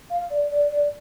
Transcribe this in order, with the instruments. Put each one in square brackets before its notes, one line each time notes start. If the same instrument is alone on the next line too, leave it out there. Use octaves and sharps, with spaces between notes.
[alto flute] F5
D5
D5
D5